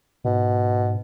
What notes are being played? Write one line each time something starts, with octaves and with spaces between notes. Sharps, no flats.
G#2 B2